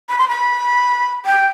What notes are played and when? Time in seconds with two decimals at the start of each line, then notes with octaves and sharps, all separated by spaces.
0.09 B5
0.18 C6
0.28 B5
1.26 G5